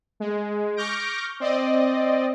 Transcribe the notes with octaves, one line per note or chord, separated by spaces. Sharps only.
G#3
C#6 D6 F6 G6 A#6 D7
C4 D5 D#5